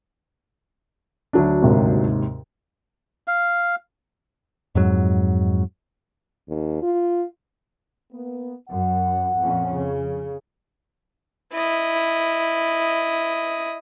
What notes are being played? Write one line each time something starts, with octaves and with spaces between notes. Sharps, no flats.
D2 F#3 D4
D#2 G#2 C3
F5
F2 G#2 F#3
D#2
F4
A#3 B3
F#2 F#5
F2 A#2 C#4
C#3
E4 D#5